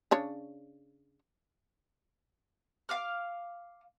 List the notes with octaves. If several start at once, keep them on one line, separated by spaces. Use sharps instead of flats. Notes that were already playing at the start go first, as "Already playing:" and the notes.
C#3 D4 C#5
F5 D6 F6